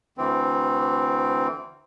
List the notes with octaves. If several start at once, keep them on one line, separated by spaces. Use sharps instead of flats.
D2 E3 C4